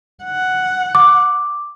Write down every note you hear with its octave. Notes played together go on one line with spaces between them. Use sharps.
F#5
D6